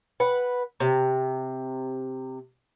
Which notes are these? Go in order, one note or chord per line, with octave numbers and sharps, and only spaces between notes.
B4 F#5
C3